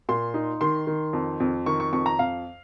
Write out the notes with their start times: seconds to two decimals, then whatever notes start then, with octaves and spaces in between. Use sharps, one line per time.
0.09 A#2 C6
0.34 D#4
0.61 D#3 C6
0.87 D#3
1.13 F2
1.40 F2
1.66 D#3 C#6
1.80 C#6
1.93 F2 C#6
2.06 A#5
2.19 F2 F5